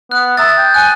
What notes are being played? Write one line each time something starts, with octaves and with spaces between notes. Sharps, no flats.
B3 F#6
E5 A#5 D#6 A6
G5
G#5 F#6